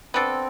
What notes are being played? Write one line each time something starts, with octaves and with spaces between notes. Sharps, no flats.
B3 C4 D4 A4